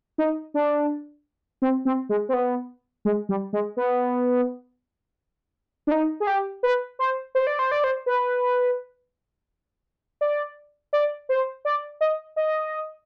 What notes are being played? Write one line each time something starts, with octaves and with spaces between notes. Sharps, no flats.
D#4
D4
C4
C4
G#3
C4
B3
G#3
G3
G#3
B3
D4
D#4
G#4
G4
B4
C5
C5
D5
C5
D5
C5
B4
D5
D5
C5
D5
D#5
D#5